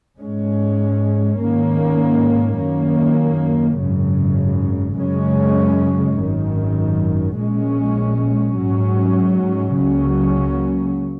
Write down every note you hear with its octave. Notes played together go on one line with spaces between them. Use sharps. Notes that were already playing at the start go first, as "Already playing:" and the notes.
G#2 G#3 C#4
G#2 D#3 A#3 C#4
F#2 D#3 A#3 C#4
G#1 F#2 C#3
F#2 C#3 G#3 C#4
G#1 F#2 D#3
A#1 A#2 G#3 C#4
G#2 F#3 C#4
C#2 C#3 F#3 A#3 C#4